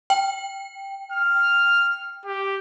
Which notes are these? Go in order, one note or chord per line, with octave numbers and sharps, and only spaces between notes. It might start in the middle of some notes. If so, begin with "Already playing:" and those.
G5
F6
G4